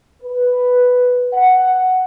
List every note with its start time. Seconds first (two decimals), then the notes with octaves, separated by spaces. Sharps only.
0.22 B4
1.33 F#5